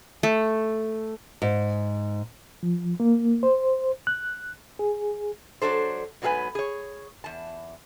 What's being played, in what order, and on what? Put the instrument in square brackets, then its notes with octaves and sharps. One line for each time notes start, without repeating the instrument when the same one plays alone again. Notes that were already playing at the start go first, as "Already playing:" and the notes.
[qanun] A3
[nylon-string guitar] G#2
[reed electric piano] F3
A#3
C5
F#6
G#4
[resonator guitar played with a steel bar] F#3 D4 A4 C5
G#2 F#3 B3 G#4 B4 G#5
G#4 C#5
E2 A5